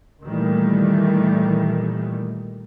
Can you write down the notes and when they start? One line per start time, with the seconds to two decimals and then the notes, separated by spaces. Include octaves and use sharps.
0.24 A#2 D#3 E3 G3 A3